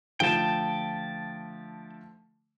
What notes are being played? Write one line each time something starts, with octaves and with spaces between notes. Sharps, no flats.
D3 F3 A3 G5 A5